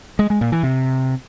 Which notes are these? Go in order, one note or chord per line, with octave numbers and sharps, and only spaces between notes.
G#3
G#3
A#2
E3
C3